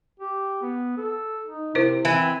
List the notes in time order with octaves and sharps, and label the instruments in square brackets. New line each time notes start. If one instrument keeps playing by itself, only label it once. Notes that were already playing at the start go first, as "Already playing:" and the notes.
[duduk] G4
B3
A4
D#4
[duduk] C3 [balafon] E4 A#4 C5
[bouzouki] E3 [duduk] C4